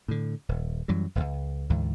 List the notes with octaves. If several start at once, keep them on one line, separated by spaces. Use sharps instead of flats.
A2 D3
D#1
F#2 E3 F#3 G3
D1 C#2
D2 G#2 E3